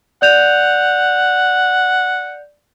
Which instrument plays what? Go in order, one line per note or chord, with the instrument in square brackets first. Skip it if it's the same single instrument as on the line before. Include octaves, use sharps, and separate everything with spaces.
[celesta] D5 G6 F7 [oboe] F#5